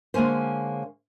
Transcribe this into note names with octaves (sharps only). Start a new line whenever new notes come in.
D3 G#3 A#3 C#4 C5